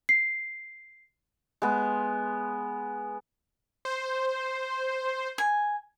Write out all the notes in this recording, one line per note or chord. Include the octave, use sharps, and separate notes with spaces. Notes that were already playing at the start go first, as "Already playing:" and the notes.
C7
G#3 B3
C5
G#5